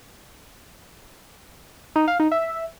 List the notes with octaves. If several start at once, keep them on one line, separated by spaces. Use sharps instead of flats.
D#4
F5
D#4
E5